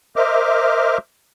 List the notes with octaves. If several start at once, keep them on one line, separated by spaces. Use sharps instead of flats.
A#4 C5 D#5 E5 D6 F6